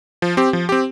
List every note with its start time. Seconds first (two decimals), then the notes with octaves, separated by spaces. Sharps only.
0.22 F3
0.37 C4 G4
0.53 F3
0.69 C4 G4